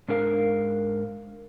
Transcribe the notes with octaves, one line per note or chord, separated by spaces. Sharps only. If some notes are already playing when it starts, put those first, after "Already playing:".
G#2 D4 A#4 F5